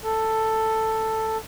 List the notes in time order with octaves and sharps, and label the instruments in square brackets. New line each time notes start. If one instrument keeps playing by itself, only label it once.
[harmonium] A4